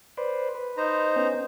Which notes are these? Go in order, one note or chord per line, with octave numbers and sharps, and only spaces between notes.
B4 C5 D5
B4
D#4 C5 A#5
B3 C#4